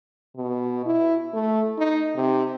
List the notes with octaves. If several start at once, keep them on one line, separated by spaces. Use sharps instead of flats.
B2
E4
A3
D#4
C3